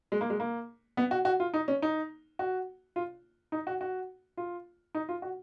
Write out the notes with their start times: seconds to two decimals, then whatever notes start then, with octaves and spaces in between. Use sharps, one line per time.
0.12 G#3
0.21 A#3
0.30 G#3
0.40 A#3
0.97 B3
1.11 F#4
1.25 F#4
1.40 F4
1.54 D#4
1.68 C#4
1.82 D#4
2.39 F#4
2.96 F4
3.52 D#4
3.67 F#4
3.81 F#4
4.37 F4
4.95 D#4
5.09 F4
5.22 F#4